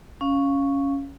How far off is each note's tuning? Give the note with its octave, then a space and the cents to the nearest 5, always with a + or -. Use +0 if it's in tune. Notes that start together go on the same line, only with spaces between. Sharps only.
C#4 +0 F5 +0